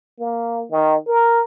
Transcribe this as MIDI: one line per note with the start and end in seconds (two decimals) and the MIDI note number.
0.20 0.64 58
0.70 0.96 51
1.07 1.41 70